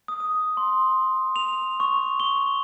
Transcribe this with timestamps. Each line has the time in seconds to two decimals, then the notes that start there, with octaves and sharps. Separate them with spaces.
0.08 D#6
0.20 D#6
0.57 C6
1.36 F7
1.80 C#6
2.20 G7